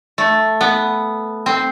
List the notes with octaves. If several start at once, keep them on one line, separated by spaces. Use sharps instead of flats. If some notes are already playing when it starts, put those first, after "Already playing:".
A3
B3
C4